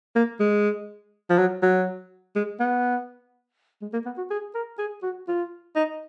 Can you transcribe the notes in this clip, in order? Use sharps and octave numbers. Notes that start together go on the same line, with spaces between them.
A#3
G#3
F3
F#3
F#3
G#3
B3
G#3
A#3
B3
F#4
G#4
A#4
G#4
F#4
F4
D#4